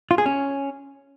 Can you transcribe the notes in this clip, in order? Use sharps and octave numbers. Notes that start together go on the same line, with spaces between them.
F4
G#4
C#4